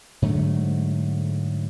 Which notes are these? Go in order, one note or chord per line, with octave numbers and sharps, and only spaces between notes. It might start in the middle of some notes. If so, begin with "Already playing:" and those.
G#2 D3 F#3 A3